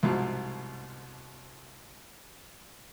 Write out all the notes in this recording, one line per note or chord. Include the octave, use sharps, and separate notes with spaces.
C2 G#2 B2 F3